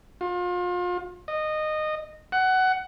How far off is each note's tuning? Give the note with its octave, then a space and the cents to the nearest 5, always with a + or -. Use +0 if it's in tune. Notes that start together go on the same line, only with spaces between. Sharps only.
F4 +35
D#5 -15
F#5 +15